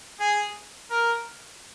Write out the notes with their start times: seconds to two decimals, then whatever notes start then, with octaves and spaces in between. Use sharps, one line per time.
0.20 G#4
0.91 A#4